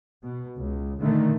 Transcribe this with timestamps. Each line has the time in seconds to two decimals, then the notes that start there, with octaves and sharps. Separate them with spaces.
0.23 B2
0.56 C#2
1.01 A#2 D3 D#3 A3